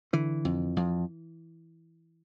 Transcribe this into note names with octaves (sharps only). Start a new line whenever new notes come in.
D3 E3
F2
F2